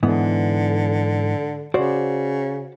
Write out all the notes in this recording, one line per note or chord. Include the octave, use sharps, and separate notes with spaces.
G#2 D3 E3 B3
C#3 F#4 C5 D5